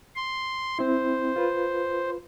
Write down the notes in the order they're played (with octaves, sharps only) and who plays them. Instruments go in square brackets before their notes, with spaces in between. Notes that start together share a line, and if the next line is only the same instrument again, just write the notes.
[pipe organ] C6
[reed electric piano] C4 E4 [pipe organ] C5
[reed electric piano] F4 B4